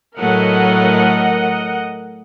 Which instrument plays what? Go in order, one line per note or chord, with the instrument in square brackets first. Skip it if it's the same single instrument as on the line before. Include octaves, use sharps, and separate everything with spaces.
[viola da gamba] A2 F#3 A3 [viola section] A#4 D#5 F#5